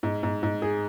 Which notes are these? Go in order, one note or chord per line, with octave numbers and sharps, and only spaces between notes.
G#2
G#2
G#2
G#4